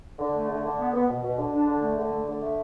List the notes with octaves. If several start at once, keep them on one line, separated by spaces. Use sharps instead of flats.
D3
A3
D3
D3
B3
B3
B2
B2
D3
D4
D3
A3
D3
A3
D3
A3